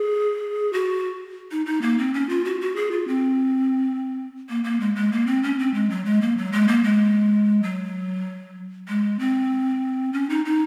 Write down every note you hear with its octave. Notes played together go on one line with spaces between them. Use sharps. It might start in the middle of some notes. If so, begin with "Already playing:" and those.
Already playing: G#4
F#4
D#4
D#4
A#3
C4
C#4
F4
F#4
F#4
G#4
F4
C4
A#3
A#3
G#3
G#3
A#3
C4
C#4
C4
G#3
F#3
G#3
A#3
F#3
G#3
A#3
G#3
F#3
G#3
C4
C#4
D#4
D#4